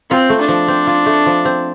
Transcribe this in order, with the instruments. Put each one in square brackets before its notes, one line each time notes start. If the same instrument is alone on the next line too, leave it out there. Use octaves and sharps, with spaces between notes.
[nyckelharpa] C4 [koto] F4
[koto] A3
[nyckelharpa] D4
[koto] F3
C4
F4
A3
F3
C4